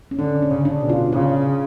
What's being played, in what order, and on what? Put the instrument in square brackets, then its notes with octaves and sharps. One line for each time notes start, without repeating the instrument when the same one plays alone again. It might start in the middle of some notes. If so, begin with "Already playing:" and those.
[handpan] C#4
[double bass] D3 [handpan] D4
[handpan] C#4
[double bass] C#3
[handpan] D4
[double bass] B2
[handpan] F4
[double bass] C#3 [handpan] F4